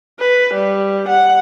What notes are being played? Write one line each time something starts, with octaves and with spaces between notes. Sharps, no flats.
B4
G3
F#5